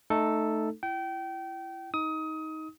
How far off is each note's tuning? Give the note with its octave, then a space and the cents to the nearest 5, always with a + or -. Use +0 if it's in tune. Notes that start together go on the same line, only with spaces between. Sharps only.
A3 +0 D#4 -15 A4 +0
E4 +30 G5 -30
D#4 +15 D#6 +25